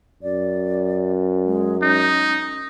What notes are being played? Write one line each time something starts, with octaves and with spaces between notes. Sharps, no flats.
F#2 D5
G#3
C#4 D#4